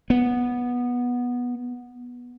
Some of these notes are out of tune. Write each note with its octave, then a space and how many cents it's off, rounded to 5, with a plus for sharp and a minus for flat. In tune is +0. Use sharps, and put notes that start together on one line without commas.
B3 -10